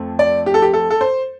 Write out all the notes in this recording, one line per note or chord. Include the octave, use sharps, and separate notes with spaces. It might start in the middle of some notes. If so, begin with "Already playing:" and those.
Already playing: F2 F3 A3 C4
D5
G4
A4
G4
A4
A4
C5